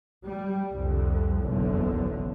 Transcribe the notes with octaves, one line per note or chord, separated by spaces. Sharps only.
G3
C2 F2 D3
F#1 B1 E2 D3